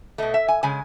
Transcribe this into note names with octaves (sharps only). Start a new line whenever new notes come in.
B2 A3 D#5
E5
G#5
C#3 G#3 G#5